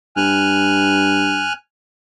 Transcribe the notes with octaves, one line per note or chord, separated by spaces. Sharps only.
G2 G#5 F6 F#6